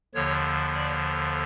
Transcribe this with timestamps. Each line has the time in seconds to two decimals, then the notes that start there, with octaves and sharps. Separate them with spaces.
0.14 D#2 D3 F3 C#5
0.75 D5